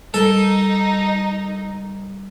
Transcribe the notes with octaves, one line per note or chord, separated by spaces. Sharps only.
G3 D#4 A4 A#4 D#5